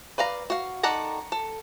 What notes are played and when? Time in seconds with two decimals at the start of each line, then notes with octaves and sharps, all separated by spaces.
0.18 B4 D5 F5 A#5
0.50 F#4 F5
0.83 D#3 A4 D5 F#5 A#5
1.32 A4